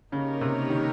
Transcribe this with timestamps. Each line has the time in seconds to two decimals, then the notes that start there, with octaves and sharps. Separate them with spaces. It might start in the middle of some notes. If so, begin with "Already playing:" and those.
0.12 C#3 A#3 D#4 G4 A#4 C#5
0.41 C3
0.70 D#3